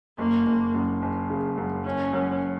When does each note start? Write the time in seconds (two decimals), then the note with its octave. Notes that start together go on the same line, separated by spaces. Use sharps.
0.18 F#1 A#3
0.46 F#1
0.74 F#2
1.02 F#1
1.30 C#3
1.57 F#2
1.85 F#1 C#4
2.13 F#2